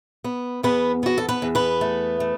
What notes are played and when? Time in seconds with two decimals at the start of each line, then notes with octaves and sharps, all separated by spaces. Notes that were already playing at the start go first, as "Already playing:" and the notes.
0.24 B3
0.63 E2 B3 B4
1.03 B3 F#4
1.18 A4
1.29 B3 B4
1.42 E2
1.55 B3 B4
1.81 A3
2.20 A3